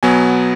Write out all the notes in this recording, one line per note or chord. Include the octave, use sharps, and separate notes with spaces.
B2 F#3 B3 G#5